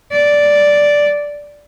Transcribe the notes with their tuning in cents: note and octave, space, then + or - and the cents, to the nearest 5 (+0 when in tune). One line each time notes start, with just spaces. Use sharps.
D5 -5